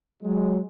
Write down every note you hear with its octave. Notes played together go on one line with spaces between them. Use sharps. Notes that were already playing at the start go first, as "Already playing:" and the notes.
F#3 G#3